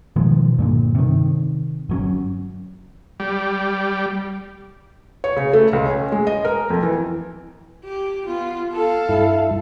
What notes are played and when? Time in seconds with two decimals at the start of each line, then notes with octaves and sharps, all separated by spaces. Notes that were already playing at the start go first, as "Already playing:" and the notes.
0.16 B2 D#3 F3 G#3
0.59 G2 A#2 D3
0.95 C3 D#3
1.89 G1 F#3 C#4
3.20 G3
5.24 C#5
5.36 C#3
5.53 A3
5.73 C#2
5.85 C#4
6.12 G#3
6.27 D#5
6.45 A#4
6.70 F2
6.83 E3
7.84 G4
8.26 B3 F4
8.73 A4 F5
9.09 G2 E4